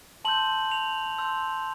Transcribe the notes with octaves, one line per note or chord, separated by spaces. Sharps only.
A5 C6 E6 G6 F#7
F7
A5 C6 E6 G6